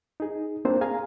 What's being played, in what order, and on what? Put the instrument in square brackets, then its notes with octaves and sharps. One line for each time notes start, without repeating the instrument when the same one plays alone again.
[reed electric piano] D#4 G#4
A#3 C4 D4 F4 C5
G#4 F5 G#5 A#5